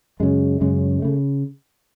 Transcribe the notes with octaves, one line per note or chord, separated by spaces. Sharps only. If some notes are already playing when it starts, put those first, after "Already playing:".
F#2 C#3 G#3
F#2 C#3 G#3
C#3 A3